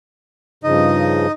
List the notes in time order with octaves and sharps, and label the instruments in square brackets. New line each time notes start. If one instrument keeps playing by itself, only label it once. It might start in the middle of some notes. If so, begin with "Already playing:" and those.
[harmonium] G2 C#3 F3 [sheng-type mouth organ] D#4 D#5